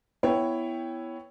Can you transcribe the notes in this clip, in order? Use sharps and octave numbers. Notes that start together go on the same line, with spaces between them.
B3 E4 C#5 G5